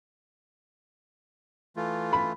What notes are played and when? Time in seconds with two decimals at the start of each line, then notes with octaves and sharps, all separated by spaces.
1.77 E3 A3 F4
2.13 B5